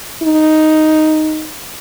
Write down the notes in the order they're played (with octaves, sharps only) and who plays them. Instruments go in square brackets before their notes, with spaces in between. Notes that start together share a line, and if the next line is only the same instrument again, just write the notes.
[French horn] D#4